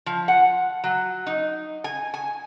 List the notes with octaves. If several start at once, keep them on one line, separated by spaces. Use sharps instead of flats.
F3
F#5
F#3
D#4
G#5
G#5